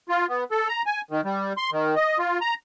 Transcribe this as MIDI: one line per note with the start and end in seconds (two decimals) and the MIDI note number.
0.09 0.26 65
0.29 0.44 59
0.51 0.68 69
0.69 0.82 82
0.86 1.01 80
1.11 1.21 51
1.24 1.53 55
1.57 1.70 84
1.72 1.95 51
1.96 2.18 75
2.18 2.39 65
2.41 2.54 82